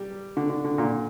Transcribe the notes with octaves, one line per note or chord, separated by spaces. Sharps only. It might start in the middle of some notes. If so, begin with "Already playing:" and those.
Already playing: G3
D3
D3
D3
A#2